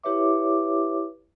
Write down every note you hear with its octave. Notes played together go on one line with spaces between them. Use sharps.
E4 G4 B4 C#5 E5 D6